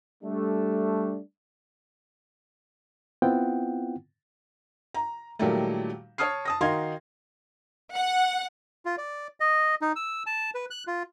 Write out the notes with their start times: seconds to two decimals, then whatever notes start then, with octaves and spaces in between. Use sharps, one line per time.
0.23 G3 A3 D4
3.22 B3 C4 E4 F4 F#5 G5
4.94 A#5
5.39 A#2 D#3 F#3 G3 A3
6.18 C#5 A5 D#6 F6 C7
6.45 A5 D#6 A#6
6.61 D#3 D#4 F#4 F5 C6 G#6
7.95 F#5
8.85 F4
8.98 D5
9.40 D#5
9.81 D#4
9.96 E6
10.26 A5
10.55 B4
10.70 F#6
10.87 F4